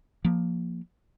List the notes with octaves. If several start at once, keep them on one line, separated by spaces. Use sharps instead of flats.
F3 A#3